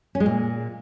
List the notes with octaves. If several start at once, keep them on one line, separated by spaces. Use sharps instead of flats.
C#4
G#3
A#2